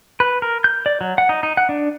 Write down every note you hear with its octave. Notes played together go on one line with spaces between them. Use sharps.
B4
A#4
G6
D5
F#3
F#5
D#4
D#4
F#5
D4